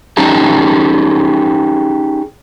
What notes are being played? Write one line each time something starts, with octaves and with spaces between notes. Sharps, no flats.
C#4 D#4 G4 G#4 A5